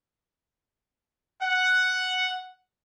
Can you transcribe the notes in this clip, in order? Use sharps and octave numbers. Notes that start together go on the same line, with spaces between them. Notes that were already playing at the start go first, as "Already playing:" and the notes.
F#5